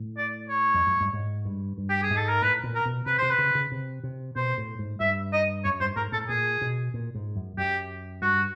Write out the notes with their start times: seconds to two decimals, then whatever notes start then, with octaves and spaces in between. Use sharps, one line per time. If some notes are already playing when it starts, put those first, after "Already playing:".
Already playing: A2
0.17 D5
0.49 C#5
0.74 F2
0.87 F#2
1.01 G2
1.13 G#2
1.45 G2
1.78 G2
1.89 G4
2.03 G#4
2.10 G#2
2.16 A4
2.29 A#4
2.42 A2 B4
2.64 A#2
2.75 A#4
2.85 B2
3.06 C3 B4
3.18 C3 C5
3.30 B4
3.38 C#3
3.55 C#3
3.72 C3
4.04 C3
4.36 B2 C5
4.58 A2
4.79 G#2
5.00 G2 E5
5.33 D#5
5.64 F#2 C#5
5.80 G2 C5
5.96 G#2 A#4
6.12 A2 A4
6.29 A#2 G#4
6.61 B2
6.94 A#2
7.15 G#2
7.36 F#2
7.58 F#2 G4
8.22 G2 F#4